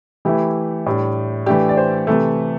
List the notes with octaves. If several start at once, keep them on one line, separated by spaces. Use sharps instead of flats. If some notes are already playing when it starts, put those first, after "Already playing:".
E3 A3 E4 G4
A2 G3 D4
E3 A3 D4 G4
D5
C5
C3 E3 A3 A4